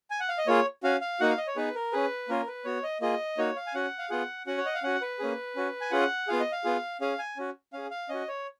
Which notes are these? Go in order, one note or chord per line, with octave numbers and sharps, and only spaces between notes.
G#5
F#5
F5
D#5
A#3 F4 G#4 C#5
C#4 F#4 F5
F5
A#3 D#4 F#4 F#5
F5
D#5
C#5
B3 D#4 G#4 B4
A#4
C#4 G#4 B4
A#3 C#4 F4 A#4
B4
B3 F#4 C#5
D#5
A#3 F4 G#4 D#5
A#3 D#4 F#4 C#5
F5
G#5
C#4 F#4 F#5
F5
B3 F4 G#4 F#5
C#4 F#4 F#5
C#5
D#5
F5
C#4 F#4 F#5
B4
A#3 C#4 G#4
C#4 F#4
G#5
C#4 F4 G#4 F#5
B3 F4 G#4 F5
D#5
F5
B3 F4 G#4
C#4 G#4 F5
G#5
C#4 F#4
C#4 G#4 F5
F5
C#4 F#4 D#5
C#5